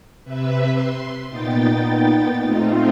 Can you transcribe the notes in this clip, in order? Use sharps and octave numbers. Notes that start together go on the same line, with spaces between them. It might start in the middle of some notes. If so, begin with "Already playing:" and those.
C3 B4 E5
C6
A#2 B3 D#4 G5 A6
A3 C4 D#4 F4